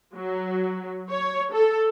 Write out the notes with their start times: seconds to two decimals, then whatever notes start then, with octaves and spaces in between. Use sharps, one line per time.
0.14 F#3
1.09 C#5
1.53 A4